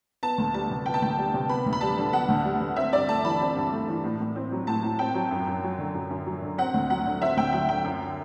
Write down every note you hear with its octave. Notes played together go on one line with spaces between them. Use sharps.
B3 A5
D2
G3 A5
C3
B3 G5
A5
D2 G5
G3
C3
B3 B5
D2
B5
G3 A5
D3
B3 F#5
D2
G3
D3
C4 E5
G2 D5
A3 A5
E3 B5
C4
G2
A3
E3
A2
A2
C4
F#3
A2 A5
A2
C4 G5
F#3
F#2
F#2
F#3
D3
F#2
F#2
F#3
D3
C4 F#5
D2
F#3 F#5
D3
C4 E5
D2 G5
F#3 G5
D3 G5
F#2